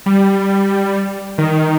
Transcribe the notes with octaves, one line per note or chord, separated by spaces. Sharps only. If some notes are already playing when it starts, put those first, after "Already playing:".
G3
D#3